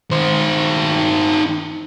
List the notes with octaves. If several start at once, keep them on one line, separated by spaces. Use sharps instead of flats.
D#3 C5